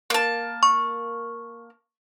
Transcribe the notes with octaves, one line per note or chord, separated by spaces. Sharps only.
A#3 A5
C#6